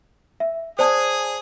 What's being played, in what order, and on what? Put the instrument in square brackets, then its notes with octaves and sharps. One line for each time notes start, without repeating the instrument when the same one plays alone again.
[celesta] E5
[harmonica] G#4 D#6 [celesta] C5 D5 A5